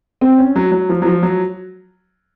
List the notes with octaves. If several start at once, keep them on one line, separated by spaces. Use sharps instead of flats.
C4
C#4
F#3
F#3
F3
F#3
F3
F#3